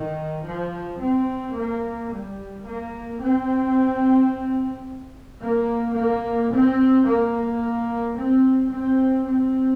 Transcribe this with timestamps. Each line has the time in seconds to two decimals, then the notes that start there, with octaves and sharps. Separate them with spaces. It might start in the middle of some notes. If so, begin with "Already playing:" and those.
Already playing: D#3
0.44 F3
0.99 C4
1.54 A#3
2.10 G3
2.65 A#3
3.20 C4
5.41 A#3
5.96 A#3
6.52 C4
7.07 A#3
8.17 C4
8.72 C4
9.28 C4